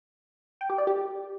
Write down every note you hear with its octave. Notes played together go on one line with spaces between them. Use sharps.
G5
G4
D5
G4